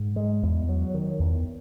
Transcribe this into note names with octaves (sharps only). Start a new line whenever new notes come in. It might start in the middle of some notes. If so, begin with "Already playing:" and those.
Already playing: G#2
G#3
E2
F#3
D#3
E2